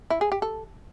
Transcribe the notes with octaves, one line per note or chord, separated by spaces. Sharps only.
E4
G#4
G4
A4